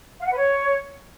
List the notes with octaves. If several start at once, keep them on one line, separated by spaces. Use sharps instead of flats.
F5
F#5
B4
C#5